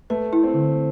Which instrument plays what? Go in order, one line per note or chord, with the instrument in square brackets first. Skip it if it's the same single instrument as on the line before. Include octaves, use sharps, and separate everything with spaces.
[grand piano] A3 [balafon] B4
[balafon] E4
[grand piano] C4
[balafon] D3